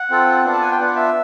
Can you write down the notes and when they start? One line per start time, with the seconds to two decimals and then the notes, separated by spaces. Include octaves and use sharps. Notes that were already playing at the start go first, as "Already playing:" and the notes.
Already playing: F#5
0.10 C4 F4 A4
0.45 B3 D4 F4
0.53 A5
0.62 G#5
0.71 G5
0.79 B3 D4 F4 F#5
0.96 E5